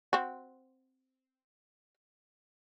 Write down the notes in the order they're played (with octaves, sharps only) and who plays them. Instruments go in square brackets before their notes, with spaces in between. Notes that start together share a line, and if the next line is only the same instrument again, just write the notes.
[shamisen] C4 F#4